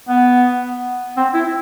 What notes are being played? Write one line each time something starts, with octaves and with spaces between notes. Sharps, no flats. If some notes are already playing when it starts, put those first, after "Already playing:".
B3
C4
E4